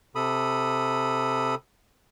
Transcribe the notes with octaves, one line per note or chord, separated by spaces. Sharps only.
C3 A4 B5 D#6